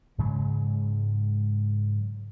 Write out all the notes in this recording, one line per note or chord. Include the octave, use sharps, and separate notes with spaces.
G#2 C#3 F#3 G#3